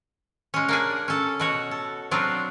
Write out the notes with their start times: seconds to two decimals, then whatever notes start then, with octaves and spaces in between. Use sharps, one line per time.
0.54 G#3 C#4
0.69 A#3 D4 G#4
1.08 C#4 A4
1.40 B2 F#4 C#5
1.71 A4
2.11 F#3 C4 D4 F4